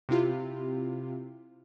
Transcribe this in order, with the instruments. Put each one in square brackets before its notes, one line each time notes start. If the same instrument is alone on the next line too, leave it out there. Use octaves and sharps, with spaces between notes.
[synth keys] C3 C4 E4 F4 G4